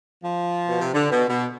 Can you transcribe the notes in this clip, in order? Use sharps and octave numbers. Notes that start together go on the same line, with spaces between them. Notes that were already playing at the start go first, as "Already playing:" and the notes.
F3
B2
C3
D3
B2
B2